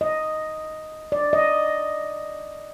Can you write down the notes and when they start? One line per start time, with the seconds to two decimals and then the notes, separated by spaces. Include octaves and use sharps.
0.01 D#5
1.12 D5
1.33 D#5